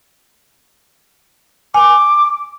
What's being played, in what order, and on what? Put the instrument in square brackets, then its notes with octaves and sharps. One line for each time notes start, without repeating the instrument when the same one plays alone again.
[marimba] G#5 [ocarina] D6